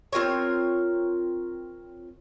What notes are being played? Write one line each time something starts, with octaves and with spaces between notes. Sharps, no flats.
C4 F4 A#4 C#5